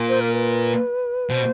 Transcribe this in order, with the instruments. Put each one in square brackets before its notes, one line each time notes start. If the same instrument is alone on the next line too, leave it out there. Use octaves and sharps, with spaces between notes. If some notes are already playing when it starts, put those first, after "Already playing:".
Already playing: [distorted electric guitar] A#2
[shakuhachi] C5
A#4
B4
[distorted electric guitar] B2 [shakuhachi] C5